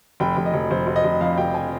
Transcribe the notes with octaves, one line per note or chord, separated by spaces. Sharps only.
F1 G5
F1
D#5
F1
F1 C5
F1
D#5
F1
F2 F5
F1 G5
G#5